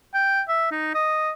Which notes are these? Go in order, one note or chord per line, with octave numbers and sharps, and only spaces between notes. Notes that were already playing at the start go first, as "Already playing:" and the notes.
G5
E5
D#4
D#5